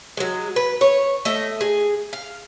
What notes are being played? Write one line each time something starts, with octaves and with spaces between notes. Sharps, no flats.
F#3 G#3
B4
C#5
A3 D#5 E5
G#4
F5